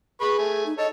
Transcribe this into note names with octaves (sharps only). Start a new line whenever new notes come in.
G#4 B4 B5 C#6
A3 G#5
D#4
A4 C#5 D#5